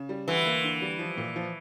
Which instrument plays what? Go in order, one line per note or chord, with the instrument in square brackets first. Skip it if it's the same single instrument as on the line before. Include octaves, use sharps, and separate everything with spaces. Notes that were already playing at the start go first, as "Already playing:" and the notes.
Already playing: [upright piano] C#3
G3
[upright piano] D2 [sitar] E3
[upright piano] A#3
D3
G3
F3
A#2
F3